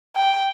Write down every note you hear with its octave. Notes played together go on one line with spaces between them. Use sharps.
G5